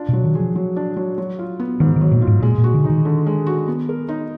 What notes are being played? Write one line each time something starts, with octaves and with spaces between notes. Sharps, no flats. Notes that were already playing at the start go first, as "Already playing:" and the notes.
Already playing: D4 F4
B2 F#3
D#3
G#4
F3
F#3
D4
F#3
F#3
F4
B3
G#2 D#3
D#3 F#3
A#2
F4
G#2
A#2 G#3
A#2
F#4
D3
D#4
D#3
D3
G#3
F#4
B3
A#4
D#4